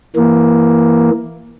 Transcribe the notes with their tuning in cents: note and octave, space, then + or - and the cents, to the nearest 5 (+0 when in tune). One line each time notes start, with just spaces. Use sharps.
E3 +0 A#3 +5